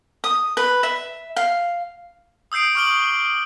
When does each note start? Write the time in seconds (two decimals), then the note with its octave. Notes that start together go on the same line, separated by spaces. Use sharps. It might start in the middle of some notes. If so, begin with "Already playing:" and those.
0.24 D#6
0.57 B4
0.83 E5
1.36 F5
2.52 D#6 E6 G6 C7 D7
2.75 C#6 D6 F6 D7 F#7 G7